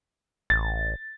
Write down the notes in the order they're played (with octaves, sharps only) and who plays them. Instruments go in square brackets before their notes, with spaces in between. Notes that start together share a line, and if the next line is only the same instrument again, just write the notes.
[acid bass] A1 [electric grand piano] A6